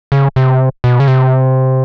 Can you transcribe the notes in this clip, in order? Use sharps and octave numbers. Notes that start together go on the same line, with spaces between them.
C#3
C3
B2
C#3
C3